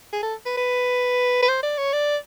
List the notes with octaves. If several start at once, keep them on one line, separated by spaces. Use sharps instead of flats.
G#4
A4
B4
B4
B4
C5
D5
C#5
D5